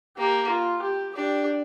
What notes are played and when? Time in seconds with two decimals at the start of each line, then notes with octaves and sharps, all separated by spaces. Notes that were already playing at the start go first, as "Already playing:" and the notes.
0.17 A#3 G4
0.49 F4
0.83 G4
1.15 D4 G4